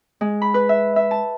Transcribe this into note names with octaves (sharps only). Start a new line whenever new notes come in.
G#3
B5
B4
E5
E5
A5